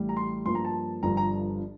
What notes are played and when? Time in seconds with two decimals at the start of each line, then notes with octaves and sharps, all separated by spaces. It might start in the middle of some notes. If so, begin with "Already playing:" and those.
Already playing: A1 A2 G3
0.09 A#5
0.17 C6
0.45 G2 F3 A#3 C6
0.55 A#5
0.65 A5
1.03 G1 G2 D3 F3 A#5
1.17 A#5